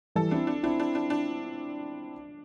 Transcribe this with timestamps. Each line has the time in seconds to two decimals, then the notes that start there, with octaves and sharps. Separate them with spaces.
0.15 E3 G3 A4
0.31 C4 D4 E4
0.47 D4
0.63 C4 D4 E4
0.80 D4
0.95 D4
1.10 D4